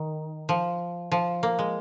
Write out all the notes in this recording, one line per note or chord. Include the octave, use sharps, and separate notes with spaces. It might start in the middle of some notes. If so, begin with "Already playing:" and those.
Already playing: D#3
F3
F3
A#3
G#3